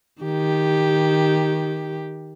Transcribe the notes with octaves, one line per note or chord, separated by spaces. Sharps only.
D#3 G4